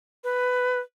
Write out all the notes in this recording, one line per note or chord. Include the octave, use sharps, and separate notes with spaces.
B4